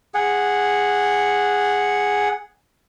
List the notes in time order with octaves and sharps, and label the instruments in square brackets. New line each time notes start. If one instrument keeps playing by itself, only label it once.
[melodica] G#4 F#5